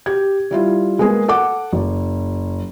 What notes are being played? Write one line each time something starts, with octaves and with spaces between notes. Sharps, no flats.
G4 G#6
G3 E4 F4
G#3 A#3 B3 G#4
A4 F#5 D6
F#1